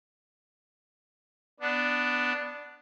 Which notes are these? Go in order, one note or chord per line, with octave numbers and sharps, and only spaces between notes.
B3 D4